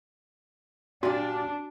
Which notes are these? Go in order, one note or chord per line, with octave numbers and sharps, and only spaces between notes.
A#2 D4 F#4 G4